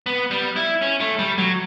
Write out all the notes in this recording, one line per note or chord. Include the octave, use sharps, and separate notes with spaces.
B3
G3
E4
C#4
A3
G3
F#3